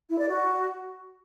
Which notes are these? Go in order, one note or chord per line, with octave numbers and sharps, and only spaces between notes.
E4
D5
F#4